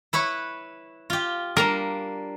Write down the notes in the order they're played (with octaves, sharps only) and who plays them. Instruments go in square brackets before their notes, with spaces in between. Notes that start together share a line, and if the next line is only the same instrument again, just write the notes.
[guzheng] E4 B4 C#5
F4 G4
[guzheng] G3 A#3 D4 [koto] A#4